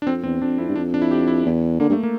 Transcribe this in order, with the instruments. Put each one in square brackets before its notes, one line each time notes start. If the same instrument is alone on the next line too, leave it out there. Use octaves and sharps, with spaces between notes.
[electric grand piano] D4
[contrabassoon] F2 [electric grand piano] C4
[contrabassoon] E2 [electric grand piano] C4
[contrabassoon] F2 [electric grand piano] D4
[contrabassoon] F2 [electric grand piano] E4
[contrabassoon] G2
[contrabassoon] F2 [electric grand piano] D4
[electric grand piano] D4
E4
G4
E4
[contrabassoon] E2
[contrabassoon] D3 [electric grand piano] A#3
[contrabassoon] G2
[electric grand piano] A3
A#3